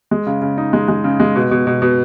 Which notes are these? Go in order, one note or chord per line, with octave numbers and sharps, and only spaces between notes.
G#3
C#3
C#3
D#4
G#3
G#3
C#3
G#3
B2
B2
B2
B2